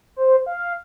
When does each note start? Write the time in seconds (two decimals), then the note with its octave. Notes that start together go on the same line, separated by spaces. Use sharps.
0.16 C5
0.46 F5